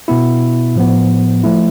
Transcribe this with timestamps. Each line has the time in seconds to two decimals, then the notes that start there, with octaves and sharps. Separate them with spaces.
0.08 B2 B3 E4
0.76 A2 F3 B3
1.44 F3 A3 E4